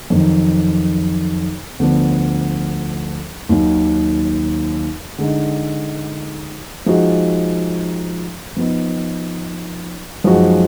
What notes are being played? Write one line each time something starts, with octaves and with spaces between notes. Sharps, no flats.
F2 D#3 F#3
D2 D3 F3 B3 D4
D#2 D#3 F#3
D3 G#3 D#4
F3 G#3 D#4 F#4
F3 B3 D#4
F#2 F3 G#3 D#4 F#4